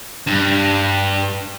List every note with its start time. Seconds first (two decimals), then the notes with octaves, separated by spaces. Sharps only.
0.27 G2